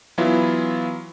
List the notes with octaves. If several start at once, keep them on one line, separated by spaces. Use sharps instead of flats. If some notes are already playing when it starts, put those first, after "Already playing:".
E3 F#3 B3 E4 F4